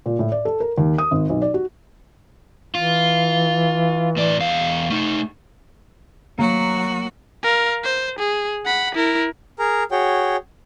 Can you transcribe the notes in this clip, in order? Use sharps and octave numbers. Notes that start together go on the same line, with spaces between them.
A#2
A2
D5
A4
A#4
D#2
D#6
G#1
B1
D5
F#4
E3 F4
A2 D5
E2 F5
A3 D#4
F#3 A#3 F#4
A#4 F5
C5
G#4
F#5 B5
E4 A#4
G#4 A#4 A#5
F#4 G#4 C#5 G5